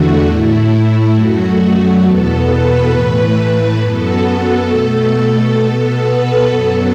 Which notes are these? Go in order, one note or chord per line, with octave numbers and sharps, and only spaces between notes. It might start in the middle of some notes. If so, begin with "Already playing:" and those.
Already playing: E2 D3 A3 F#4
A2 A3 E4
F#2 F#3 A3 F#4
E2 B2 B3 A4
B4
A2 E3 A3
F#2 F#3 B3 A4
B2 A3
A4
B2 B3
B4
F#2 F#3 B3 A4